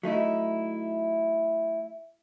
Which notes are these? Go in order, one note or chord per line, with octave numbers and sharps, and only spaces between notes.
F#3 A3 D#4 E4